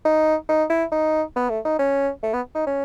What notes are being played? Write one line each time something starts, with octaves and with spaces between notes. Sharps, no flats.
D#4
D#4
E4
D#4
B3
A3
D#4
C#4
A3
B3
D#4
C#4